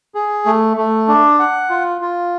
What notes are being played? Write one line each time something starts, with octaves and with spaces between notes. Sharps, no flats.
G#4
A3
A3
D4
F#5
F4
F4